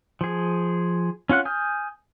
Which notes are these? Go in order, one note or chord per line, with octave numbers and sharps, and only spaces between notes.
F3 G#4
C#4 F4 F#5 F#6
G#5 D#6 F6 G6